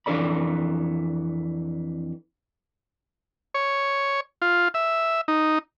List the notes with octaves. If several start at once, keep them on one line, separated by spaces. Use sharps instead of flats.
F2 E3 D4 A4 D5 B5
C#5
F4
E5
D#4